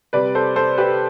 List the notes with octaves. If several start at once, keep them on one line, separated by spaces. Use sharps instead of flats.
C3 G3 B4 D5
A4 C5
A4 C5
G4 B4